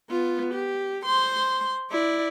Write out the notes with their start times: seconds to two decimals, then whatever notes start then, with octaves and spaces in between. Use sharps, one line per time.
0.10 B3 F4
0.54 G4
1.06 C5 C6
1.91 E4 D5